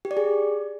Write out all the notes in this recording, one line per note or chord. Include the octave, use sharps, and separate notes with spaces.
G4
D5
G#4